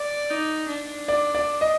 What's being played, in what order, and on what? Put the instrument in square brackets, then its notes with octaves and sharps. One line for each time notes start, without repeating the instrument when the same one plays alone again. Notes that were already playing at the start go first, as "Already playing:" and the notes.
Already playing: [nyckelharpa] D5
D#4
D4
[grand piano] D5
D5
D#5